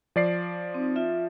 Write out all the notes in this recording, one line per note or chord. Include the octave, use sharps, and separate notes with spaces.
F3 D5 C7
C4 D#4
F4 E5